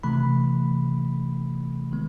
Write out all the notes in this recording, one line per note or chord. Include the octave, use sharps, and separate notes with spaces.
C3 E3 A3 B5
D#3 G#3 B3